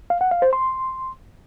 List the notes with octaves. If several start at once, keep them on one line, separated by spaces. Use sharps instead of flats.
F5
F#5
F5
C5
C6